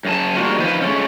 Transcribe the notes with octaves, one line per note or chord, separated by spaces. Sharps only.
F#2 G#4 A5
G3 G#3 A#3 D4 F4 F#4
D#3 F3 B4 C5
G#3 A3 C#4